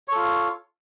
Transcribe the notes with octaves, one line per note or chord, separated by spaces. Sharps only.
F4 A4 C#5